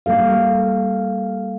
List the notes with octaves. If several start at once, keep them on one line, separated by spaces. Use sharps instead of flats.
G3 A#3 A4 F5